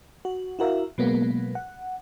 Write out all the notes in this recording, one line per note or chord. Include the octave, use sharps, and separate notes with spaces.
F#4
E4 F#4 A#4 E5 F5
B2 F#3 G#3 A#3 B3
F#5